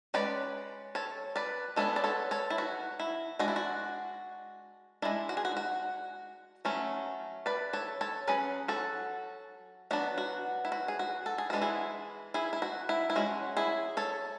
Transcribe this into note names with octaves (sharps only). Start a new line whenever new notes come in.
G#3 C#4 B4 D5
A4 C#5
B4 D5
G#3 B3 D4 A4 C#5
D5
A4 C#5
A4 C#5
E4
F#4
E4
G#3 D4 F#4
E4
F#4
G#3 D4 E4
F#4
G#4
F#4
F#4
F#3 A3 C#4
B4 D5
A4 C#5
A4 C#5
F#3 C#4 G#4 B4
F#4 A4
F#3 B3 D4 F#4
F#4
E4
F#4
G#4
F#4
A4
G#4
E3 G#3 D4 F#4
E4 G#4
E4 G#4
E4
F#4
E4
E4
G#3 C#4 F#4
E4 G#4
A4 C#5